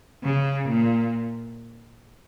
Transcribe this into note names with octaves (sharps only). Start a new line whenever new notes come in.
C#3
A#2